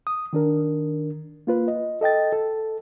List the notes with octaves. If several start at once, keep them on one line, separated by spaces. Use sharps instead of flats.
D#6
D#3 D4 A#4
A#3 F4 B4
D#5
A4 D#5 G5 A6
A4